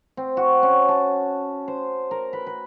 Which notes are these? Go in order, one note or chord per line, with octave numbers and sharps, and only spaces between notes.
C4
F#4
C#4
A5
C5
A#4
B4
B4